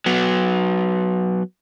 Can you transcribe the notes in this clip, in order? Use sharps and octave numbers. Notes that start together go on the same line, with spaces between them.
F#3 B3